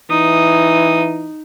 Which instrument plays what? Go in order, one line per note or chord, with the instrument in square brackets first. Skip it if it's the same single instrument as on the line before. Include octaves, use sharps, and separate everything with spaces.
[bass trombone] E3 [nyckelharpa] D#4 D#6